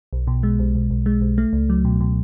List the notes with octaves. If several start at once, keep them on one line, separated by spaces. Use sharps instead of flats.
B1
B2
G#3
B1
B1
B1
G#3
B1
A3
C#2
F#3
B2
B2